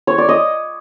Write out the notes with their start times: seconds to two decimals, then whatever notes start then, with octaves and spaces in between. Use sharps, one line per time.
0.07 C#5
0.18 D5
0.29 D#5